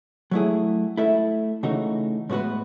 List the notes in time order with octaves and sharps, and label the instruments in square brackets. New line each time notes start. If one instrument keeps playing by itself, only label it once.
[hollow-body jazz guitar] F#3 A3 E4 G#4
A3 E4 A4 E5
C#3 E3 A3 D#4 F#4
A2 G#3 B3 F#4 B4